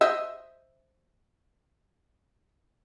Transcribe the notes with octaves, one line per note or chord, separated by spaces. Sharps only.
C5 D#5 E5